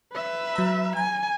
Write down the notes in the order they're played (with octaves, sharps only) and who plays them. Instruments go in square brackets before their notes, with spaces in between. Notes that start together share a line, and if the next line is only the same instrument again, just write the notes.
[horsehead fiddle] B4 E5
[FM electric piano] F#3 A#5
[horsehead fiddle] G#5 [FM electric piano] A#5